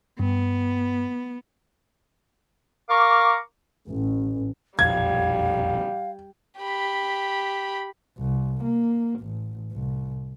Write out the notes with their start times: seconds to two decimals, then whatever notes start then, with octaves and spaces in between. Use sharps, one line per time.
0.19 G2 B3
2.89 A#4 F5 A#5 C#6 D6
3.87 A1
4.79 E1 A#1 F2 G3 F5 G#6
6.58 G4 B5
8.18 C2
8.64 A#3
9.20 A1
9.73 C2